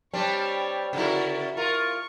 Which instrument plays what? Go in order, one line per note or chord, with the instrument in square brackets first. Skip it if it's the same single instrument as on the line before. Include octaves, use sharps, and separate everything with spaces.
[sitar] G3 C4 D4 [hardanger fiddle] C#5
[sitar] C#3 E4 [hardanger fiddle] F#4 A#4
[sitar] F4 A#4 [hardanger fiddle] C#6